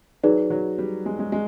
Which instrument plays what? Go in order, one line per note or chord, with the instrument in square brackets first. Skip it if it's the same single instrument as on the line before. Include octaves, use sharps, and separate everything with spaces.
[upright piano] F#3 [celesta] D#4 G#4 B4 D5
[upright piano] F#3
G3
G#3
G#3
G#3